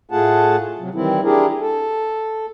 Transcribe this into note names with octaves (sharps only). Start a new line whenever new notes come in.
A2 A3 F4 G#4 F#5 A5
C3 F#3
D#3 E3 G3 C4 E4
D4 E4 G4 G#4 A#4
A4